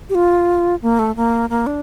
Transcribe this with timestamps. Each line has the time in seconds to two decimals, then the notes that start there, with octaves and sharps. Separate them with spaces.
0.10 G4
0.15 F4
0.82 A#3
0.99 A3
1.16 A#3
1.50 A#3
1.67 D4